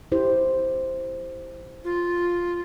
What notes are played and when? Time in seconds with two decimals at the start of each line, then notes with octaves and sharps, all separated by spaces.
0.12 E4 G4 C5
1.84 F4